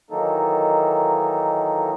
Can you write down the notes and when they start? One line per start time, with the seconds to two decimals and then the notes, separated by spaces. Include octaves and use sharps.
0.10 D#3 E3 F#3 A#3 D#4 A4